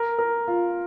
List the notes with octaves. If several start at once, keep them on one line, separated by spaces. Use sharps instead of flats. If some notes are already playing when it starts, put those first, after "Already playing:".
Already playing: A#4
A#4
F4